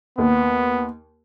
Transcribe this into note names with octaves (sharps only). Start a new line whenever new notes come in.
D#2 B3